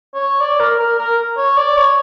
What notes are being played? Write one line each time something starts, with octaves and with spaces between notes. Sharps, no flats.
C#5
D5
A#4
A#4
A#4
C#5
D5
C#5